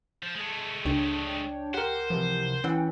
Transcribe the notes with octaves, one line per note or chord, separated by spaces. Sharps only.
F3
G#3 A3
C#2 D4 C#5 G5
G4 A#4 C5 F#5
C3 E3 F3
E3 C#4 F#5 G5